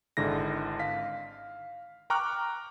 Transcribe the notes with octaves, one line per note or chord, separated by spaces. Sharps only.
G#1 G#2 D3 E4 A#6
F5 B6
G5 A#5 C#6 D6 F6 F#6